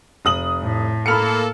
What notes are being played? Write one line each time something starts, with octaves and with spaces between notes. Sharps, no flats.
F1 D#6 F#7
A2
A#3 A4 B5 F6 C#7